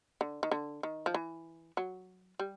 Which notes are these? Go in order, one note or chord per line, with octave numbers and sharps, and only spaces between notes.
D3
D#3
D3
D#3
F3
E3
F#3
G3